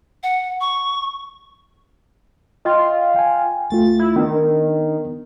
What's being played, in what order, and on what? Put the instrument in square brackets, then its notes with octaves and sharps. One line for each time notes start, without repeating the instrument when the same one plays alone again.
[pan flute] F#5
C#6
[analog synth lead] F4 [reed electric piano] D#5 G5 C6
[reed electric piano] G5 G#5
[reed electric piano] C#2 A3 F4 [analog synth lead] A6
[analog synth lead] E4
[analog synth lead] D#3 [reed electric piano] B3 D4